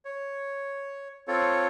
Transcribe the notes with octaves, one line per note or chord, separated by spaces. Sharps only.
C#5
C4 F4 A4 C#5